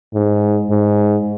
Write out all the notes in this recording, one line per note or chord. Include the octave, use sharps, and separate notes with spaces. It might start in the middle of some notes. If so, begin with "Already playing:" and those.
G#2
G#2